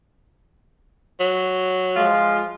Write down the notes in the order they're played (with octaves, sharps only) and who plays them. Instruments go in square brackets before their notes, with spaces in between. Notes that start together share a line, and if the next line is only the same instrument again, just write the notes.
[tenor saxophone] F#3
[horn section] F3 G#3 F4